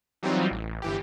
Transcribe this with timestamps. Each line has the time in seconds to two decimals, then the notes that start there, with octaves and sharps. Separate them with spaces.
0.23 E3 F#3 G3 C4 D#4 F4
0.51 A1
0.82 G1 E3 G4